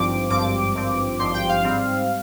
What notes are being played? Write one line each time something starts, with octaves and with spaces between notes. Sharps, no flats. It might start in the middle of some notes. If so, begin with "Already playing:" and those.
Already playing: G#1 G2 F3 C4 D6
G#1 G2 F3 C4 D6
G#1 G2 F3 C4
G#1 G2 F3 C4 C6
G5
F5
G#2 G3 C4